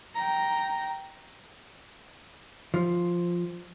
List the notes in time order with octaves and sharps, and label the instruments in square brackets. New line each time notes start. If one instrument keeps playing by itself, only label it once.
[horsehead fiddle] G5 A#5
[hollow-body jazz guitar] F3